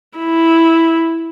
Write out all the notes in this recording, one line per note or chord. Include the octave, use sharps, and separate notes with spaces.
E4